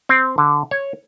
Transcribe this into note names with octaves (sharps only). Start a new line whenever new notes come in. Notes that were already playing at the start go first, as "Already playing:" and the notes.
C4
D3
C#5